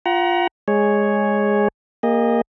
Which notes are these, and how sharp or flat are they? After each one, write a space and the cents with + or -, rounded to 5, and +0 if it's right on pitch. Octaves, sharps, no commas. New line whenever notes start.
F4 +0 F#5 +30 A#5 +25
G#3 -5 G#4 +0 C#5 +0
A#3 +0 G#4 -45 D#5 -5